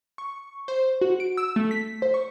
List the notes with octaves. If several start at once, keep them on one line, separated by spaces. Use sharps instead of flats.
C#6
C5
F#4
D7
E6
A3
B6
C5
C#6